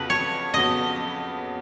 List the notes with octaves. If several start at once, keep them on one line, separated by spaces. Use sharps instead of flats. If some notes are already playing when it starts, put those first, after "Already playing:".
Already playing: F2 C#3 F#3 B3 B4
C#5
F2 C#3 F#3 B3 D#5